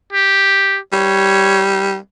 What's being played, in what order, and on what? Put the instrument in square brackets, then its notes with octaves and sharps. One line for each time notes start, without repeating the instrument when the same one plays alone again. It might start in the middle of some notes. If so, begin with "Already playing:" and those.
[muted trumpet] G4
[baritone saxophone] G3 [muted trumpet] C#5